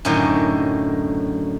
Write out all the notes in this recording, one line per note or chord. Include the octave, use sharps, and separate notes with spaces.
F#2 A2 D3 D#3 F#3